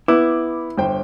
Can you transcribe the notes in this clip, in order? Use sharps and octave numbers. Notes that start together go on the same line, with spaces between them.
B3 E4 D6
G1 C5 G5